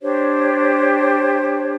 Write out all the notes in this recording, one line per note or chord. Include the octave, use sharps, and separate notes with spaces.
D4 G4 C5 C#5